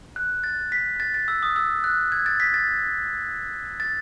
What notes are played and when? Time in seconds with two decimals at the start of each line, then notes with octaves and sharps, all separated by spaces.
0.16 F#6
0.44 A6
0.72 B6
1.00 A6
1.14 A6
1.28 E6
1.43 D#6
1.56 E6
1.84 F#6
2.12 G#6
2.26 A6
2.40 B6
2.54 A6
3.80 A6